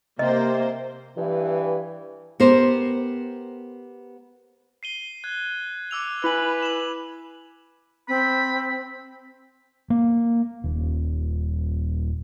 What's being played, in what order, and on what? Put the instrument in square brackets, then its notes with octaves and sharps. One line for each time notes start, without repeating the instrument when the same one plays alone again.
[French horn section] C3 [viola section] A#3 C5 [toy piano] D#5
[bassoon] G2 [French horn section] E3
[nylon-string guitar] B3 G4 A#4 C5
[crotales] C7 D#7 G7
F#6 G#6
D6 E6 F7
[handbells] E4 G#5 [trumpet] B4 [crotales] F7 F#7
[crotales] E7 F#7
[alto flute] C4 [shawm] B5
[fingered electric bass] A#3
D#1